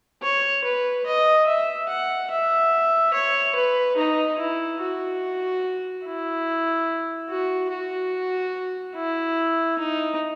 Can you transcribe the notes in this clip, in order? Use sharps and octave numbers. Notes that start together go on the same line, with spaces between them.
C#5
B4
D#5
E5
F#5
E5
C#5
B4
D#4
E4
F#4
E4
F#4
F#4
E4
D#4